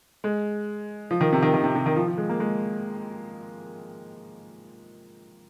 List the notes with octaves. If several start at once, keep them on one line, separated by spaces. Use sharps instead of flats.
G#3
F3
D#3
C3
D#3
D#3
C3
C3
D#3
F3
F3
G#3
A#3
G#3